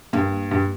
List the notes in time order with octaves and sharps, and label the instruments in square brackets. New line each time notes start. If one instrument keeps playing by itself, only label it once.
[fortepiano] G2 [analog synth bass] A#3
[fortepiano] G2